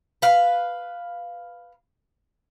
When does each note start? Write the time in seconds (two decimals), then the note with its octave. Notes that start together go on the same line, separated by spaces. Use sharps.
0.22 B4 F5